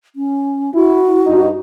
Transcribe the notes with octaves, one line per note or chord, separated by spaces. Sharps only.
C#4
E4 F#4
G2 D#4